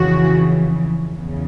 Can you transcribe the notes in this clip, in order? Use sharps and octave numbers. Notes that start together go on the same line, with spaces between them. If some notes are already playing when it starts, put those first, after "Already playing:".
Already playing: F2 C#3 E3 F#4
E2 C#3